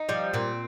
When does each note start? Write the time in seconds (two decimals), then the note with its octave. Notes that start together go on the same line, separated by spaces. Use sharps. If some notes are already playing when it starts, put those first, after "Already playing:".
Already playing: D#4
0.09 F3 G3
0.34 A#2 C4